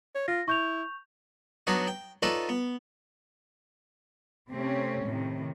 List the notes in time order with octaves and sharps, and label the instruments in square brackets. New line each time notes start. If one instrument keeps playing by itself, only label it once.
[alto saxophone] C#5
[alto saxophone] F4 [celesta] A#6
[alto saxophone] E4 [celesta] C#6 G6 F7
[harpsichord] F#3 B3 D4 D#4 C#5 F#5
G5
D#4 F4 A4 B4 C#5 D5
B3
[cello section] C3 A3 C4 C#4
A2 C3 D#3